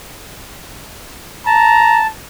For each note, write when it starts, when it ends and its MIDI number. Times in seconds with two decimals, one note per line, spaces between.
1.46 2.07 81
1.46 2.02 82